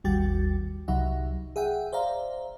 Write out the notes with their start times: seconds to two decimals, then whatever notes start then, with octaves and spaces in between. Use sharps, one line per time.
0.04 G#1 D#2 G3 F#4 G5 A6
0.88 C2 F#3 D#4 E5 F#5
1.56 G#4 E5 F#5 G5
1.93 C5 D5 E5 F5 A#5